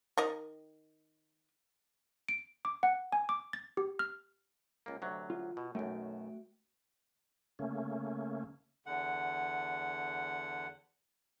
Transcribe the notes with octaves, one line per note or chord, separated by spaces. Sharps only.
D#3 A#4 D#5
D7
D6
F#5
G#5
D6
A6
G4
F6
C#2 A#3
D2 C3 F#3
F4
B2
B1 F#2 A3 F#4 G5
C#3 A3 A#3 C#4
E2 D3 F#5